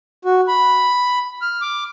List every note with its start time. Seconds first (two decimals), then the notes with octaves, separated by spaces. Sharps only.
0.25 F#4
0.48 B5
1.42 F6
1.62 D6